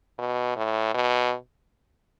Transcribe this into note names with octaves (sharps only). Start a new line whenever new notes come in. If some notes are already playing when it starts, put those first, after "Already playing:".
B2
A2
B2